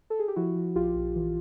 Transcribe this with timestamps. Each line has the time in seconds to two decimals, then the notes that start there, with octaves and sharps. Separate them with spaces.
0.10 A4
0.19 G#4
0.28 G4
0.36 F3 E4 F#4
0.55 F3
0.75 A#1 F4 G4
0.96 A#1
1.16 E3